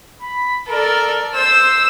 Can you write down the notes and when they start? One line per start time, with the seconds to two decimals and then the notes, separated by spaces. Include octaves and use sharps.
0.22 B5
0.68 A4 A#4 D5
1.35 C5 E6